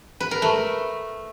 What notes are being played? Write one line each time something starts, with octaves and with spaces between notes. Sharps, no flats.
B4
A#4
A3